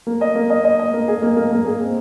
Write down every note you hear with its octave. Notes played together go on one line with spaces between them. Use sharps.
A#3
D#5
A#3
D#5
D#5
D#5
A#3
G#4
A#3
A#3
A#3
G#4
C4